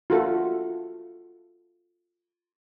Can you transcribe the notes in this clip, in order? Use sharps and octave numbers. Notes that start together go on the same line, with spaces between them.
F4 F#4 A4